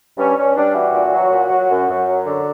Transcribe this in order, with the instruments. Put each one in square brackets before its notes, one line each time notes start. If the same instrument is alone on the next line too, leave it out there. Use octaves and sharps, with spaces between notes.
[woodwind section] G2 C#4
G2 C#4
G3 D4
E3 F#4
A#2
F#3
A#2
F#3
F#2
F#2
F#3
D3